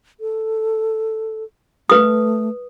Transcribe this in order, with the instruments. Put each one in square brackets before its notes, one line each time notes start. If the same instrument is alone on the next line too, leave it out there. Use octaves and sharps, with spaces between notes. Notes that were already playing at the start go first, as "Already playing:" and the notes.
[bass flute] A4
[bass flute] A3 [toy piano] B4 D#6